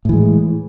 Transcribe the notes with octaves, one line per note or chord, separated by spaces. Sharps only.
A2 E3 G#3